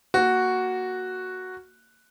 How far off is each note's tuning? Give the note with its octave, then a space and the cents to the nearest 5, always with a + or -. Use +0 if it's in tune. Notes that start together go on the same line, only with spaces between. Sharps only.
A#3 +0 F#4 +0